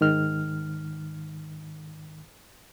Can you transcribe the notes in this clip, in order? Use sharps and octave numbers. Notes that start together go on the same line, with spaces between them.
G#2 D#3 F6